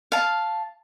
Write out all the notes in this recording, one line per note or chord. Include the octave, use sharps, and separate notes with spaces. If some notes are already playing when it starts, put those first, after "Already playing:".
F5 A5